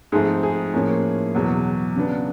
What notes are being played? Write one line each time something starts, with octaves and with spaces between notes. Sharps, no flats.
G#2 F3 A3 C4 G#4
G#4
A2 F3 A#3 C#4
E2 B2 F#3
C#3 F#3 B3 D4